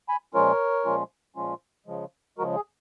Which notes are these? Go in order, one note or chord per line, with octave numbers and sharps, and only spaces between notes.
G#5 B5
A#2 F3 G#3 C#4 F4 A#4 C#5
A#2 F3 G#3 C#4 F4
A#2 F3 G#3 C#4 F4
C#3 F3 G#3
C#3 F3 G#3 F#4 A#4
G#4